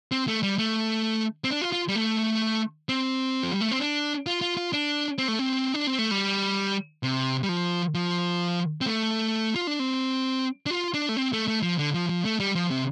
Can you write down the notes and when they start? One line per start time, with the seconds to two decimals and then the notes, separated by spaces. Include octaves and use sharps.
0.12 C4
0.28 A3
0.43 G3
0.58 A3
1.44 C4
1.51 D4
1.61 F4
1.72 F4
1.88 G3
1.96 A3
2.89 C4
3.43 F3
3.51 G3
3.61 A3
3.71 C4
3.80 D4
4.26 F4
4.41 F4
4.57 F4
4.73 D4
5.18 C4
5.28 A3
5.39 C4
5.74 D4
5.87 C4
5.99 A3
6.11 G3
7.03 C3
7.43 G3
7.49 F3
7.95 F3
8.81 C4
8.86 A3
9.55 F4
9.67 D4
9.79 C4
10.66 D4
10.70 F4
10.94 D4
11.09 A3
11.17 C4
11.33 A3
11.48 A3
11.62 F3
11.78 D3
11.94 F3
12.09 F3
12.25 A3
12.40 G3
12.55 F3
12.71 C3